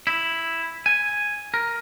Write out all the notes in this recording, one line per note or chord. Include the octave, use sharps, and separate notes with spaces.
E4
G#5
A#4